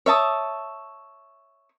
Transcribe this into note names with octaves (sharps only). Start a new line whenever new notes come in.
C#5 E5 A5 D#6